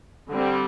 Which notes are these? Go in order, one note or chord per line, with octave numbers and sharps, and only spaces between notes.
D3 G3 C4